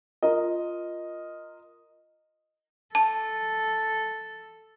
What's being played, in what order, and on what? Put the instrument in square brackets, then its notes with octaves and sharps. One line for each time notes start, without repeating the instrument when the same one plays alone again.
[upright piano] F4 A#4 D#5
[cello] A4 [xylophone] A5